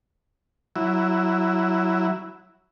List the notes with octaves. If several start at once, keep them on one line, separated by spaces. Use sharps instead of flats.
F#3 E4